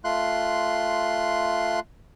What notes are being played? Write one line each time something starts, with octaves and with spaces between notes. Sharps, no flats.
A3 F4 C6 F#6